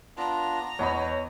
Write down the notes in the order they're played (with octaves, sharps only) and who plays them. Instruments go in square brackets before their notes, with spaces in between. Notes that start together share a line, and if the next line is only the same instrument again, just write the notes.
[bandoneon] B3 D4 F4 [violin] A#5
[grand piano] E2 D#5 B5 [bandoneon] E3 [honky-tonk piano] C#5